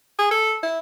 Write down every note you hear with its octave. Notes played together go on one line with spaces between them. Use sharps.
G#4
A4
E4